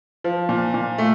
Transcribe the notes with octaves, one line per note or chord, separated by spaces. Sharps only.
F3
A#2
A#2
A3